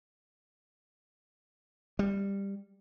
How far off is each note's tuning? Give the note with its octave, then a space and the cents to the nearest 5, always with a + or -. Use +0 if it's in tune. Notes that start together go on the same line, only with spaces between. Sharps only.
G3 +15